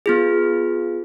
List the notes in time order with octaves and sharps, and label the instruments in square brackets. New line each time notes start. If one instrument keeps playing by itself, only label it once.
[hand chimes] B3 F4 G#4